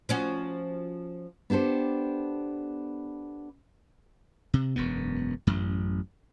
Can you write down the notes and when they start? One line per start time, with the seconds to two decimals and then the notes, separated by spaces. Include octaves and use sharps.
0.09 F3 C#4 F#4
1.50 B3 D4 G4 A4 C5
4.54 C3
4.76 E1 F#2 B3
5.47 A1 F#2